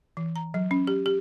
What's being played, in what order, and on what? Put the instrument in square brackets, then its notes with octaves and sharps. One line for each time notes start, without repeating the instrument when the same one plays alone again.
[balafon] E3
A#5
F#3
C#4
G4
G4